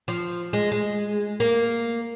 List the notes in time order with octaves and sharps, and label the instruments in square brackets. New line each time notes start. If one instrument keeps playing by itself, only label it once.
[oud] F3
G#3
G#3
A#3